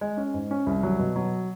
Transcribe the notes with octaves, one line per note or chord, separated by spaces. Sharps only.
G#3
C#4
G#2
C#4
C2
F#3
B2
F#3